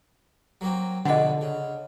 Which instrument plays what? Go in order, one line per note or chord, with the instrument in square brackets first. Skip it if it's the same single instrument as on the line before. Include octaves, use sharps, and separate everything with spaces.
[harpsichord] F#3 A#3 C4
[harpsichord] A#1 B2 B5 [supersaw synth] D3 [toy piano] D#5 F#5
[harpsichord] C#3